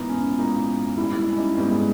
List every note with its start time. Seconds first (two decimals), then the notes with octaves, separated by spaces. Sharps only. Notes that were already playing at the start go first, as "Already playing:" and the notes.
Already playing: A#1 G#2 E3 A#3 B3 D#4
0.09 C#4
0.38 A#1 G#2 E3 A#3 D#4
0.97 G#1 G#2 G3 E4
1.17 E4
1.30 C#4
1.37 D#4
1.56 G#1 G#2 G3 B3
1.71 G#3